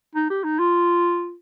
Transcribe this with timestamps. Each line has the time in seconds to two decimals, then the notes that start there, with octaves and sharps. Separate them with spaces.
0.15 D#4
0.30 G4
0.44 D#4
0.59 F4